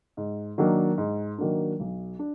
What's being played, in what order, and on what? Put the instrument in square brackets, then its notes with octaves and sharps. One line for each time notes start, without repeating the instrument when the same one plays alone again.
[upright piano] G#2
D#3 F#3 A#3 D4
G#2
D#3 F#3 A#3 D4
B1
D4